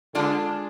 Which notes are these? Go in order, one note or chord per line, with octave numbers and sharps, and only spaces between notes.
D3 G#3 D4 F4 G#4